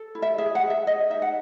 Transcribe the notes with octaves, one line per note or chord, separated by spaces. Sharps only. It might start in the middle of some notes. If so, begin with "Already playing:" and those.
Already playing: A4
E4
E5
G#4 E5
F#5
G#4
E5
G#4 D#5
D#4 E5
F#5